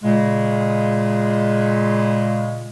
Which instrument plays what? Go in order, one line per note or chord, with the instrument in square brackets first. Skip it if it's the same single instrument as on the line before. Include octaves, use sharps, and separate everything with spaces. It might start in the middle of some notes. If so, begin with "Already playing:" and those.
[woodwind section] A#2 C#3 G#3